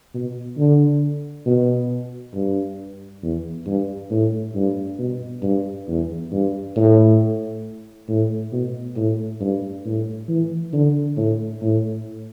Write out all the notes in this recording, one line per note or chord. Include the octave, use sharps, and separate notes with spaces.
B2
D3
B2
G2
E2
G2
A2
G2
B2
G2
E2
G2
A2
A2
B2
A2
G2
A2
E3
D3
A2
A2